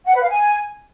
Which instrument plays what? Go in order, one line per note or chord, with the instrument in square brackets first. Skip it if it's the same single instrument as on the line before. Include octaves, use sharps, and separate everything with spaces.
[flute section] F#5
B4
F5
G#5